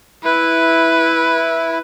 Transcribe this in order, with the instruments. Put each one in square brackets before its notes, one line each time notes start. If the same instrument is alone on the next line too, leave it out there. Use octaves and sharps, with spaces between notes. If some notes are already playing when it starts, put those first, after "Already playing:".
[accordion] E4 [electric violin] B4